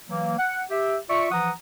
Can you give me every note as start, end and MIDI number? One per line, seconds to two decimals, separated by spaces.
0.08 0.36 52
0.08 0.36 54
0.08 0.36 58
0.38 0.61 78
0.70 0.96 67
0.70 0.96 76
1.09 1.30 65
1.09 1.30 74
1.09 1.30 76
1.09 1.30 85
1.31 1.50 52
1.31 1.50 53
1.31 1.50 78
1.31 1.50 82
1.31 1.50 87